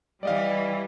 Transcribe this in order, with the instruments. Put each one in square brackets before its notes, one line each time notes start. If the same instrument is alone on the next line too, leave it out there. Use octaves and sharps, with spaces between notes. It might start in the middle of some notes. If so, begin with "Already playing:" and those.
[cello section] E3 G3 [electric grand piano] D5 D#5 F5